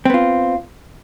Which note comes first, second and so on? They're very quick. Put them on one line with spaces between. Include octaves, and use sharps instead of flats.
C4 B3 F4